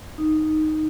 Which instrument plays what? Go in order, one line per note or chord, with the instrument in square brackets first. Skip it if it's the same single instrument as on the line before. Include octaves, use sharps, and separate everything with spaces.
[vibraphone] D#4